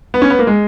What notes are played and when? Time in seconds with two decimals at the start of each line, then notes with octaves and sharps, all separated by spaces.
0.14 B3
0.22 C#4
0.30 B3
0.39 A#3
0.47 G#3